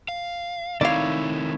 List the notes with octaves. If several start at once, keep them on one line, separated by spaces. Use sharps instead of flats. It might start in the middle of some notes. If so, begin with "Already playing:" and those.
F5
D#3 A3 C4 D#4 E4 C#5 D5 F5